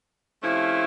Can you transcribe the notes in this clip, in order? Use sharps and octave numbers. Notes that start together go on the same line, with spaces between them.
C3 F3 A3 C#4 E4